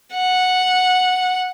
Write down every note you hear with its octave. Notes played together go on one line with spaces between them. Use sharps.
F#5